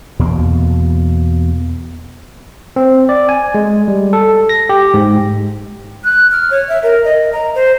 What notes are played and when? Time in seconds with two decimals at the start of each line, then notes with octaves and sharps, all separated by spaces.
0.19 E2 B2 A#3
2.76 C4
3.09 D5
3.29 G#5
3.55 G#3
3.88 G3
4.13 A4
4.49 A#6
4.69 G4
4.94 G#2
6.04 F#6
6.32 F6
6.51 C#5
6.69 E5
6.83 A#4
7.05 D#5
7.33 A#5
7.55 C5